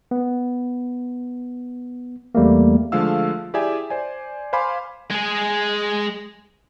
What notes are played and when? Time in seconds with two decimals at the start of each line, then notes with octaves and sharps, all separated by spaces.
0.11 B3
2.35 E2 G3 A3 A#3
2.92 D3 F3 G#3 A3 F5 E6
3.54 E4 G4 G#4 D5 E5 G#5
3.90 C5 D5 G#5
4.53 C5 F5 G#5 B5 C6 D6
5.10 G#3 G#4